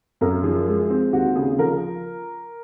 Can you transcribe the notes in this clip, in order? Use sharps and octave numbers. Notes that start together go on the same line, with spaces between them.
F#2 A#4
F3 G#4
G#3
C4
D#2 F#4
C#3 G#4
F3 A#4